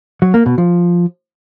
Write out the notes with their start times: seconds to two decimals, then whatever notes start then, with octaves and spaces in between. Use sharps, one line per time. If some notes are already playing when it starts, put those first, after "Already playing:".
0.22 F#3
0.34 A#3
0.46 B2
0.58 F3